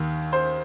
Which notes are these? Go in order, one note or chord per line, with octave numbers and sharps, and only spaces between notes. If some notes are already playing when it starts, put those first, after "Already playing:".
Already playing: D#2 D#3
C5